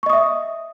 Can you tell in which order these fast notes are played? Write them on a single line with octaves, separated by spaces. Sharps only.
C#6 D#5 D#6 E5